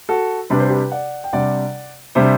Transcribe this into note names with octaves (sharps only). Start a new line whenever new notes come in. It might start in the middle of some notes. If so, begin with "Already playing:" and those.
F#4 A4
C3 G3 D4 B4
C5
G4 B4
D5 F#5
G5
C3 G3 D4 D5 F#5
C3 G3 D4 C5 E5